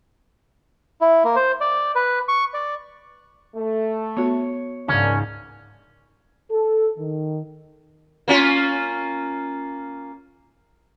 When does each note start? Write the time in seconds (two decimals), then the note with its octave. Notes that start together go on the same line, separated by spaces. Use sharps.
1.01 E4
1.24 A#3
1.36 C5
1.61 D5
1.95 B4
2.28 C#6
2.54 D5
3.56 A3
4.17 B3 F#4 C#5
4.88 C#2 G#2 A#3 C#4 D4
6.51 A4
6.99 D#3
8.28 A#3 C#4 F4